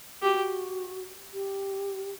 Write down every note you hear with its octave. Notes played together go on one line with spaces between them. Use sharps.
F#4 G4
G4